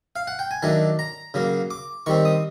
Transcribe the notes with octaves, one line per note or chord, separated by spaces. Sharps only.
F5
F#5
G5
G#5
D#3 F#3 A3 D4 A5
A#5
C#3 F#3 A#3
D6
D#3 G3 C4 C#6
D#6